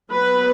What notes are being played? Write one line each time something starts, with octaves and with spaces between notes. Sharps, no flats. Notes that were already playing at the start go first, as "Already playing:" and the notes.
F#3 B3 B4